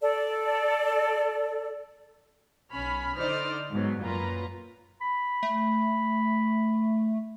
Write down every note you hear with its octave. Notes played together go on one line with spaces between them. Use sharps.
A4 D5
B1 C#4 B5 F6
D3 D#4 C5 D5 F6
G#2 B2 F#3
F#2 A#2 F4 B4 A#5
B5
A3